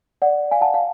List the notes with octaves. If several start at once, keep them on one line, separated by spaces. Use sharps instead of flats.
D5 F#5
F5 G#5
F#5 A5
F5